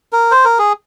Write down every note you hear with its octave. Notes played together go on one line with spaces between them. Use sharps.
A#4
C5
A#4
G#4